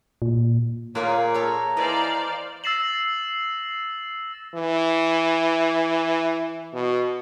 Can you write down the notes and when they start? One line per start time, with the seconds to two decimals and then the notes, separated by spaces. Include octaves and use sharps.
0.22 A#2
0.95 A#2 A#3 C#5 G#5
1.34 A4 C#5 A#5
1.77 E3 C5 D5 D#5 F5
2.64 E6 A6 A#6 C7 E7 F#7
4.55 E3
6.73 B2